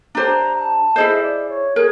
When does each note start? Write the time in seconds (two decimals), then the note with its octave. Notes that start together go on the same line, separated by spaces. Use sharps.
0.15 D4 G4 C5 A#5
0.55 A5
0.96 E4 G#4 C5 D#5
1.23 D5
1.50 C#5
1.76 G#4 A#4